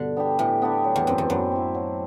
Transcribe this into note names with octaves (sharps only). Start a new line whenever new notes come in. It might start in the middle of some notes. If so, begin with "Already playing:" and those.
Already playing: G2 B2 D3
B3 D4 G4
A2 E3
B3 D4 G4
F#3
E2
F#2 C4 E4
E2
F#2 F#3
C4 E4
F#3